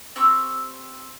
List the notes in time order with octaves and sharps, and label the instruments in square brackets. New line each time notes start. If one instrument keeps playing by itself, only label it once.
[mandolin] C4 G4 C#6 E6